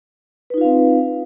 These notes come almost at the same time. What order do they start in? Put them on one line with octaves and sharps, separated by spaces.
B4 D#4 F4 F5 C4